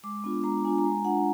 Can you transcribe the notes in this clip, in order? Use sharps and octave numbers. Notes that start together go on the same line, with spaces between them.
G#3 D6
B3 D4 F4
G#3 A#5
B3 D4 F4 G#5
A#5
G#3 G#5
D4 F4 F#5